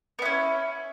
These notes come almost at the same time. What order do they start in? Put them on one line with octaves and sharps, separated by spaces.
B3 E4 C#4